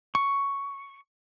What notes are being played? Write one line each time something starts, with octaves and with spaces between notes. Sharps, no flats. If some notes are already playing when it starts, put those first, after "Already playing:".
C#6